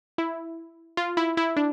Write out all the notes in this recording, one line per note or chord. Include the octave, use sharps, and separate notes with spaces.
E4
F4
E4
E4
D4